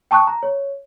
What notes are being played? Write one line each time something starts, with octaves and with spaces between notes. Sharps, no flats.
G5 A5 C#6 D#6 F#6
A#5
C#5